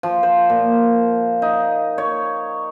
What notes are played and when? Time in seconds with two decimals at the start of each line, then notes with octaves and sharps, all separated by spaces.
0.03 F3
0.23 C5
0.50 A#2
1.42 D#4
1.98 C#5